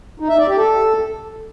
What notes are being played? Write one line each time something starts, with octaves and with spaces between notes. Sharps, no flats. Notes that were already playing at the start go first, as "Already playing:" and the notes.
D#4
E5
D5
G4
A4